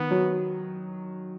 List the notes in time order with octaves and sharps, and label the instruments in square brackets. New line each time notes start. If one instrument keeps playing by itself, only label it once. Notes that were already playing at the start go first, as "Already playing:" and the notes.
Already playing: [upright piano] D#3 [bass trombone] B3
[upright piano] F#3